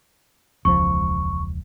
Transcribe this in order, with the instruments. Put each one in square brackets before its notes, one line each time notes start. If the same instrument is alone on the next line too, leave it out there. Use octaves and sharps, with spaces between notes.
[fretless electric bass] E1 C#2 F3 [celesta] C#6